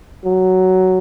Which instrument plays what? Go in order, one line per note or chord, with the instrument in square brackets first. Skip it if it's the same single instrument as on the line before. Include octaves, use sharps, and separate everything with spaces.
[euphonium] F#3